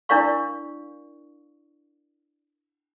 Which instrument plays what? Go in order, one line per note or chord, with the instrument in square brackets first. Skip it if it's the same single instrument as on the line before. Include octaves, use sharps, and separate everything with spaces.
[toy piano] D4 E4 A#4 D5 F5 C#6